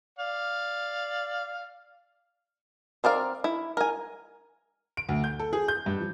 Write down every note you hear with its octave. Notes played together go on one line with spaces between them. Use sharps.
D5 F5
C4 A#4 D5 F5
E4
A#4 G#5
D7
D2
G6
A4
G#4
G6
G2
F3